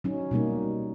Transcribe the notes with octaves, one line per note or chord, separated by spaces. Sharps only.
F#3 C#4 D#4
B2 G3 A#3 D#4